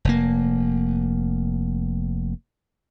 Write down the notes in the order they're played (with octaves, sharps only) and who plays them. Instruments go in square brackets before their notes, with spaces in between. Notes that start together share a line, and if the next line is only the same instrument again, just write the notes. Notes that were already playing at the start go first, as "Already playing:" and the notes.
[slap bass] F1 A#3